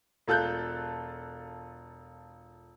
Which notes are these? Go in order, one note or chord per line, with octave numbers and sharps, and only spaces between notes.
E1 F4 A4 F#6 G6